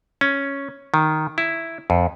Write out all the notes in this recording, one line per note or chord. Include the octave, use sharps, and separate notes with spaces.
C#4
D#3
E4
F2